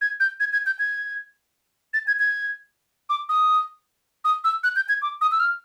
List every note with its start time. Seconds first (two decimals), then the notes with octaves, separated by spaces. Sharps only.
0.01 G#6
0.20 G6
0.40 G#6
0.53 G#6
0.66 G6
0.79 G#6
1.94 A6
2.07 G#6
2.19 G#6
3.09 D6
3.29 D#6
4.24 D#6
4.44 E6
4.63 F#6
4.76 G6
4.89 G#6
5.02 D6
5.21 D#6
5.31 E6
5.40 F6